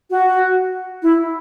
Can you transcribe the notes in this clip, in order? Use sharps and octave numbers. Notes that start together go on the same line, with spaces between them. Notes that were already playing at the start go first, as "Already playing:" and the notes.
F#4
E4